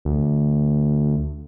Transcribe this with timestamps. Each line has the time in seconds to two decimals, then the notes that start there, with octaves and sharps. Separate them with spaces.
0.05 D2